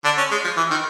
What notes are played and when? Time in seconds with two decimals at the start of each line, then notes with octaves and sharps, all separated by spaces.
0.04 D3 D4
0.18 C#4
0.31 G#3
0.44 F3
0.57 E3
0.71 D#3